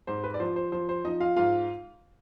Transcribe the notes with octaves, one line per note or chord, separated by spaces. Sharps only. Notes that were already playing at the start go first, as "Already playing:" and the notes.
G#2 C5
B4
D5
F3 C5
C5
F3 C5
C5
F3 D#4 D#5
F4 F5
G#2 F4 F5